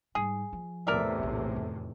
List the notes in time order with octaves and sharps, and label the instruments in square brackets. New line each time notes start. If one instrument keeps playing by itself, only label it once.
[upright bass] G#2 G3 [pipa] G#4
[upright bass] F3
[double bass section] E2 A2 C3 [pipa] A#4 D5 E5
[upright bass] A#1 D#4
F2 D#3